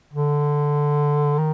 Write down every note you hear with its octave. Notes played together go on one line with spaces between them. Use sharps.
D3
D#3